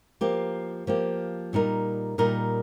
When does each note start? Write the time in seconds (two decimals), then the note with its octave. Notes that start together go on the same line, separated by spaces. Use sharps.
0.21 F3 A#3 G4
0.87 F3 A#3 G4
1.53 A#2 G3 D#4 A#4
2.18 A#2 G3 D#4 A#4